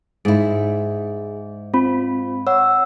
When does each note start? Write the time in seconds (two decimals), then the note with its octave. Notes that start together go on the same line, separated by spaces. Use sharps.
0.25 G#2 E4 G#4
1.74 C4 F4 B5
2.47 C#5 F#5 E6